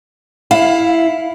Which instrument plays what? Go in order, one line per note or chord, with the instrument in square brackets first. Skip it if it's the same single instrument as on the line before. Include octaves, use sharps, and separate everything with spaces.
[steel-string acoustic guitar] E4 [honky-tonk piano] F5